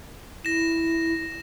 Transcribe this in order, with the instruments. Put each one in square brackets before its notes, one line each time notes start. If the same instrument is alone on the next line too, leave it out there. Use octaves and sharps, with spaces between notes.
[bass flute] E4 [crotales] A#6 E7